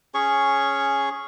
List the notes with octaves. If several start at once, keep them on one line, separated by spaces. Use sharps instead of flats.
C#4 G#4 C#5 C#6